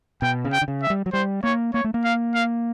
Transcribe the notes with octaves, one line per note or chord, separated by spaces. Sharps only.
B2 G5
C#3
G5
D3
C#3
E5
G3
F#3
G3 C5
A#3 C#5
A#3 C#5
A3
A#3
F5
F5